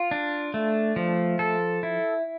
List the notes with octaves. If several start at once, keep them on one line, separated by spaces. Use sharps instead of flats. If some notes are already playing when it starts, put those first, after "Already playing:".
Already playing: F4
D4
A3
F3
A4
E4